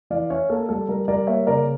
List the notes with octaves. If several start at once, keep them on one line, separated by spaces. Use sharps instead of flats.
E3 D5 F5
C#4 C#5 E5
A#3 A4
G3 A4
G3 A#4
G3 A#4 D5
A#3 C#5 E5
C#3 A#4 D5